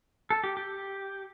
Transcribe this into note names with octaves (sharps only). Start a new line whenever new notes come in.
A4
G4
G4